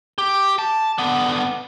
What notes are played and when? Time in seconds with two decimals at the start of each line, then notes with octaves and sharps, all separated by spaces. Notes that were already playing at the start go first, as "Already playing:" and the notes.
0.18 G4
0.59 A5
0.98 D3 B3